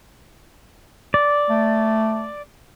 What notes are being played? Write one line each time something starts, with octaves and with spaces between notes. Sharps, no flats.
D5
A3